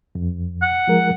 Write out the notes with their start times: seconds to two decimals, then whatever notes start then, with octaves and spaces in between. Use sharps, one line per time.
0.15 F2
0.62 F#5
0.87 F3 G#3 A#4